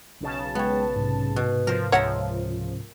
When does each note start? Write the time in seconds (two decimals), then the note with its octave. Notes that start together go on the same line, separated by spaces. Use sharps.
0.20 B1 C#3 A5
0.55 G#3 B3 C#5 G5
0.96 G#2 C3
1.36 B2
1.67 F3 A#4 C5
1.92 C#2 F3 A#4 C#5 E5 F#5 A#5